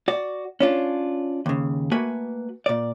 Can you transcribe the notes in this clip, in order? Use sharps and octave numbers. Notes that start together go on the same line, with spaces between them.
F#4 D5
C#4 D4 F4
D#2 C#3
A3 A#3 F#4 B4 G#5
A#2 D5